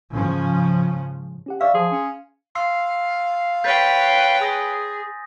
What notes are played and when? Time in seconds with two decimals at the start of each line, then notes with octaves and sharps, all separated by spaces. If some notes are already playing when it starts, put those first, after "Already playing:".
0.15 G#2 C#3 F3 C#4
1.46 C#4 G4 F#5
1.61 D5 E5 F5 C#6 F6
1.74 F3 G#4 C6
1.92 C#4
2.55 F5 C6 E6 C7
3.64 B4 C#5 G5 G6 A6 B6
4.40 G#4 G#5 D#6 A#6